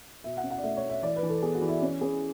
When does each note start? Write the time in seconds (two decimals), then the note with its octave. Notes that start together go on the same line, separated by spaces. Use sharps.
0.24 B2 E5
0.37 F#5
0.44 C#4
0.51 F#5
0.58 D5
0.63 A3 E5
0.77 C#5
0.83 A3
0.90 E5
1.03 E3 D5
1.16 B4
1.23 E3
1.29 A4
1.42 B3 G#4
1.55 F#4
1.62 E3
1.69 E4
1.82 C#4
2.01 C#4 G#4